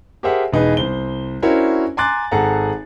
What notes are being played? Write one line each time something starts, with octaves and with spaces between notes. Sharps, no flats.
G4 G#4 A#4 C5 E5 F#5
E1 D#4 G#4 B4
C2 C5 G7
C#4 D4 E4 F#4 A#4 C5
G#5 A#5 C6 D6 F#6 A6
G#1 G#4 A4 F#5 A5 A#5